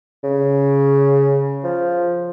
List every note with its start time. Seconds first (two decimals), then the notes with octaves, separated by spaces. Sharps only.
0.24 C#3
1.64 F3